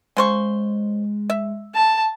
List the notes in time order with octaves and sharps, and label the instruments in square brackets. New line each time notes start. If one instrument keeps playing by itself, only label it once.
[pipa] C#3 C5 C#6 [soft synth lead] G#3
[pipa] E5
[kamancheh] A5